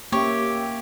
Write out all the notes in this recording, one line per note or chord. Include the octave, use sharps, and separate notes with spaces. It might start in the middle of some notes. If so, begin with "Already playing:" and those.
A#3 C#4 G4 C#5 E5